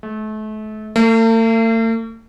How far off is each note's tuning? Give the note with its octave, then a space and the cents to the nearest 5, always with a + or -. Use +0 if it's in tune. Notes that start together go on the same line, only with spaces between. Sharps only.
A3 -35
A3 +45